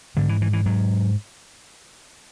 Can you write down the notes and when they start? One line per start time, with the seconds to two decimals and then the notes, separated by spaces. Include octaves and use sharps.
0.17 G#2 D3
0.29 E3
0.42 E3
0.53 E3
0.66 G#2 F#3